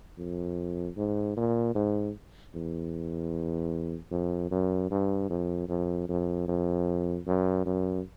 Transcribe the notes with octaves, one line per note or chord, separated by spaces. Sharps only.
F2
G#2
A#2
G#2
E2
F2
F#2
G2
F2
F2
F2
F2
F#2
F#2